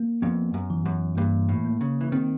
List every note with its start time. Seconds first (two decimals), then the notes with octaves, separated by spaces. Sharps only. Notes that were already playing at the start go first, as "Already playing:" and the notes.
Already playing: A#3
0.22 F2 B3
0.54 F#2
0.70 E3
0.86 F#2
1.17 G2 A#3
1.49 A2
1.65 A#3
1.81 C#3
2.01 E3
2.12 D#3 C4